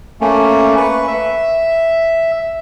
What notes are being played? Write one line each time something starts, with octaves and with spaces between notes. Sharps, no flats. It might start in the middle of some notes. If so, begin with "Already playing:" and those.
A3 A#3 C#4
B4 C#6
E5